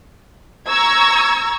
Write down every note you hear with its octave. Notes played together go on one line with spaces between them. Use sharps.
A#5 C#6 E6 G#6